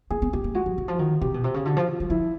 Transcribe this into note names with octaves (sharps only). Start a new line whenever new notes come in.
A#3 G#4
B3
B3 G4
A#3
G#3 F#4
F3
E3
F3
F4
D#3 F#4
C3 G4
B2
C3 G4
C#3
D3 F#4
F3
F4
F#3
F3 E4